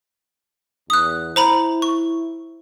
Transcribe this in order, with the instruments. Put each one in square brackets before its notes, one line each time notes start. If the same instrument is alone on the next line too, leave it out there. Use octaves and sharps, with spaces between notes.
[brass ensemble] E2 [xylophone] D#6 F#6
[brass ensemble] E4 [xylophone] C5 A#5 B5
[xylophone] C#6